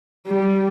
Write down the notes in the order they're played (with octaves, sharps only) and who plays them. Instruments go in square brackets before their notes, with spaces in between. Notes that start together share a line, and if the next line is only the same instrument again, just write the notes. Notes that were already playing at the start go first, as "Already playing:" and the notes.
[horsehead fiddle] G3